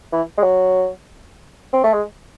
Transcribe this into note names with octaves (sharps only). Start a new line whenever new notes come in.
E3
G#3
F#3
C4
A3
G#3